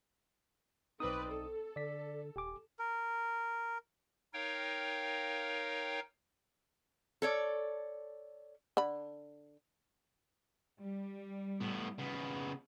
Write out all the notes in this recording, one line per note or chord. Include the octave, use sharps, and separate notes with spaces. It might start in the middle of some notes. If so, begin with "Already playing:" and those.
B1 C4 D#4 B4 D5 D#6
A4
D3 D5 B6
D#1 G4 G#5 D6
A#4
D#4 A#4 C#5 F5 G5
A4 C#5 D5
D3 B5
G3
A2 B3
C#3 B3